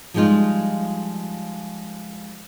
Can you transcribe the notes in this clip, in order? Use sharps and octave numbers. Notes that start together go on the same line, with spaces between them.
F3 G3 G#3 D#4 F4